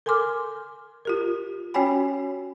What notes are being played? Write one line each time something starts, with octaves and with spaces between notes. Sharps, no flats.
A4 A#4 G#5 C6 D6 F6
F4 G4 A#4
C#4 F#4 C#5 G5 G#5 B5